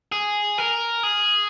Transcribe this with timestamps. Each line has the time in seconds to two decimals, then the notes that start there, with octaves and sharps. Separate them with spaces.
0.12 G#4
0.58 A#4
1.03 G#4